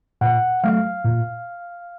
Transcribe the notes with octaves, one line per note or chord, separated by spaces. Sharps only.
A#2 F#5
F#3 A3 F5
A#2